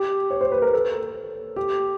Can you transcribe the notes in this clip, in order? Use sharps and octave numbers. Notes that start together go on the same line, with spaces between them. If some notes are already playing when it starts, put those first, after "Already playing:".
Already playing: G4
C#5
C5
B4
A#4
A4
G4